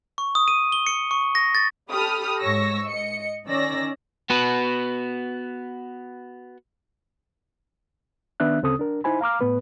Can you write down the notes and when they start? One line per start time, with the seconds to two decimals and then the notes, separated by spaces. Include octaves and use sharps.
0.18 C#6
0.35 D#6
0.48 D#7
0.72 G7
0.87 C#7
1.11 C#6
1.35 A#6
1.55 A6
1.91 G4 A4 B5 D#6 F6
2.40 G#2 C#5 C#6 E6 A#6
2.86 D#5 C#7
3.47 D#3 C#4 D5 E6 A#6
4.30 B3 F#4 B4
8.40 D#3 B3 D4 E5 F#6
8.62 D2 C#3 C4 A4 D#6
8.79 D4 A#4
9.04 D#4 E4 C5 G#5 B5
9.21 F5 A#5 D6 F6
9.41 A2 B3 B4